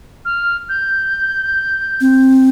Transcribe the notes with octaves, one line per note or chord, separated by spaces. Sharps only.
F6
G6
C4